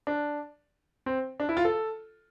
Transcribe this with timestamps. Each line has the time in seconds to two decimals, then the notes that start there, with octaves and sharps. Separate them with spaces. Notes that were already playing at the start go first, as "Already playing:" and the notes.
0.07 D4
1.06 C4
1.40 D4
1.49 E4
1.57 F4
1.65 A4